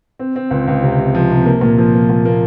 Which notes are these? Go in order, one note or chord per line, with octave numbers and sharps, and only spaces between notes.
C4
C4
C#2
C#2
C3
C3
F3
C3
A#3
A#2
F3
A#3
A#2
A#3